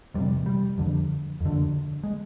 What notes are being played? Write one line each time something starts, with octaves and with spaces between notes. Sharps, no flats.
F2 G3
C3
G3
F2 D3
F2 D3
G#3